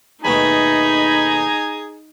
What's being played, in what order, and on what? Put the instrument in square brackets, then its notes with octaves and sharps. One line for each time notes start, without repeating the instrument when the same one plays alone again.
[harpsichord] D#2 B2 A3 [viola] D#4 [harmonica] G#4 G#5 A#5 [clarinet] B5